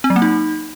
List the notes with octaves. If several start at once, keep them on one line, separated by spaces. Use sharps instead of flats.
C4
F#3
A#3
D#4